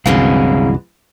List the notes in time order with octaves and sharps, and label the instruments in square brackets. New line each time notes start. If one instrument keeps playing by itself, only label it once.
[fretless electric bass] C2 F#2 [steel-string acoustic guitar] D3 E3 G#3 [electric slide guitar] C4 G#4 F5